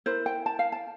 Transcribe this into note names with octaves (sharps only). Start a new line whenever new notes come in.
E4 A#4 C5
G5
A5
F5
A5